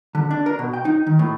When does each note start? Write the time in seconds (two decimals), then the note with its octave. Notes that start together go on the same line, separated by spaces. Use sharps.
0.15 D3
0.31 D4
0.46 A#4
0.59 B2
0.73 G5
0.85 D#4
1.06 D#3
1.19 A2